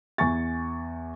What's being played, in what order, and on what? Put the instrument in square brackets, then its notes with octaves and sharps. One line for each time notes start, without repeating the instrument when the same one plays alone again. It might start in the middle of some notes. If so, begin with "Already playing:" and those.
[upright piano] E2 G#5 C#6 A6